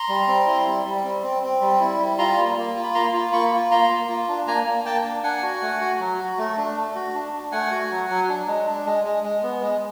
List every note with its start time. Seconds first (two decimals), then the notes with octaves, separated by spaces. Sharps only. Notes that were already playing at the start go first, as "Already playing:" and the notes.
Already playing: A#5 C6
0.09 G3
0.28 C4
0.47 E4
0.66 G3
0.85 G3
1.04 C4
1.23 C4
1.43 C4
1.61 G3
1.80 E4
2.00 G3
2.18 F4 A#5 C6
2.37 A#3
2.57 A#3
2.76 F4
2.83 B5
2.94 A#3 A#5 C6
3.13 F4
3.32 A#3 B5 C#6
3.52 F4
3.71 A#3 A#5 C6
3.90 A#3
4.09 F4
4.28 D4
4.47 A#3 G#5 A#5
4.66 A#3
4.85 A#3 G5 A5
5.04 D4
5.23 D4 F#5 G#5
5.43 F#4
5.62 A3
5.80 F#4
6.00 F#3
6.19 F#4
6.38 A3
6.57 D4
6.76 A3
6.95 F#4
7.15 D4
7.33 D4
7.52 A3 F#5 G#5
7.71 F#4
7.91 F#3
8.10 F#3
8.29 D4
8.47 G#3
8.67 D4
8.86 G#3
9.05 G#3
9.24 G#3
9.43 B3
9.62 G#3